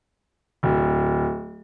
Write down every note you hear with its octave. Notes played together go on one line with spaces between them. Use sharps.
D1